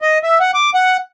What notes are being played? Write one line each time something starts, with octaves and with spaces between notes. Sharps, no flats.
D#5
E5
F#5
D6
F#5